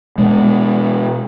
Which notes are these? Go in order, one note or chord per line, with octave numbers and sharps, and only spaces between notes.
B2 G#3